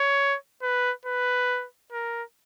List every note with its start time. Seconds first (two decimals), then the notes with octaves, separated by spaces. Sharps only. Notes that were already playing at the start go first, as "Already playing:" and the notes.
Already playing: C#5
0.62 B4
1.05 B4
1.92 A#4